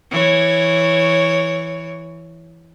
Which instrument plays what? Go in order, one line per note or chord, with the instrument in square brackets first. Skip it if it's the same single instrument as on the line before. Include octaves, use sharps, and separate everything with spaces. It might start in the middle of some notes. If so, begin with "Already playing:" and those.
[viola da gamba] E3 C#5